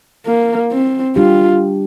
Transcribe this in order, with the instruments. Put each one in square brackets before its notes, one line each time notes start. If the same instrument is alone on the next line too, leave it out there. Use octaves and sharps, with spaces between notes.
[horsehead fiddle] A#3
C4
[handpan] G3 D4 G4 [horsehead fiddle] F4